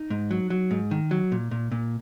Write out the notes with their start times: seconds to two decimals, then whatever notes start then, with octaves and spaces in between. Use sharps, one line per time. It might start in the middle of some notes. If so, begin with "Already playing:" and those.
Already playing: D#4
0.10 G#2
0.31 F#3
0.50 F#3
0.71 G#2
0.91 D#3
1.11 F#3
1.32 A#2
1.51 A#2
1.72 A#2